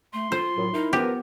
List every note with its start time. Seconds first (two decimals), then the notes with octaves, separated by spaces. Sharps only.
0.13 A3 C6
0.32 F4 C5
0.56 F#2 A2 F#3
0.74 D#4 E4 A#4
0.93 F3 B3 G4 A#4 B4